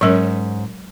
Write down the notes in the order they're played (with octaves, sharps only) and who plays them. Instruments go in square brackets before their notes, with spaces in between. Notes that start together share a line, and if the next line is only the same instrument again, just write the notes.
[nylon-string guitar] G#2 C#4 [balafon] F#3 G#3 A#4